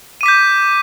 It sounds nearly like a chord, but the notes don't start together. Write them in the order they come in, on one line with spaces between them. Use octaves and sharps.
D#7 D6 B6 G6